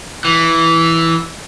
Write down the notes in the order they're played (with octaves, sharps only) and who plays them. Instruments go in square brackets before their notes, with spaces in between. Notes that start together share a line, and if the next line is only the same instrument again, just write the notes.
[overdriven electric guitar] E3